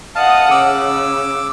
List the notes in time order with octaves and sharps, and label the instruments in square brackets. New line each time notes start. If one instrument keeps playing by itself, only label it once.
[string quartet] D#5 F#5 D#6 [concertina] F5 A5
[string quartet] C#3 [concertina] D6 E6